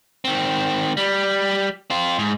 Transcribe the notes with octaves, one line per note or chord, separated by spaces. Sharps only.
D#3 C4
G3
C4 F4
G#2